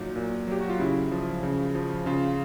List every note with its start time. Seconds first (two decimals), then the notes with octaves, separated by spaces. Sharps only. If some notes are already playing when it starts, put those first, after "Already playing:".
Already playing: A#2 F#3 D#4
0.16 A#2
0.47 F#3 G4
0.61 F#4
0.70 F4
0.80 C#3 E4
1.11 F3
1.43 C#3
1.75 F3
2.06 C#3 F4